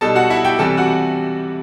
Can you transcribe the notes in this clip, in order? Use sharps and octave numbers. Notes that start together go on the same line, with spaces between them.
B2 G3 D#4 A4 A5
F#4 F#5
E4 E5
G4 G5
C3 E3 G3 A4 A5
F#4 F#5